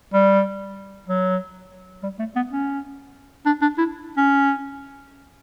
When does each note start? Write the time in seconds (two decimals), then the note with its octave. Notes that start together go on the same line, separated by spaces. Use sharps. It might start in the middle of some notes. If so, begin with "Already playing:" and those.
0.13 G3
1.08 F#3
2.03 G3
2.19 A3
2.36 B3
2.51 C#4
3.46 D4
3.62 D4
3.78 E4
4.17 C#4